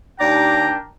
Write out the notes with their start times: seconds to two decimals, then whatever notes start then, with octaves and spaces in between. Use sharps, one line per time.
0.20 D#2 D4 A#4 D5 G5 A#5